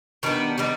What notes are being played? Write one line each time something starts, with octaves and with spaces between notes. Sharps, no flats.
D#3 G3 B3 D4
D#3 G3 B3 D#4